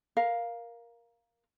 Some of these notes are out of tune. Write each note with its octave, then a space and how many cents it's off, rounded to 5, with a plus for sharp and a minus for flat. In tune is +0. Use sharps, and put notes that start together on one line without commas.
A#4 +10 F5 +0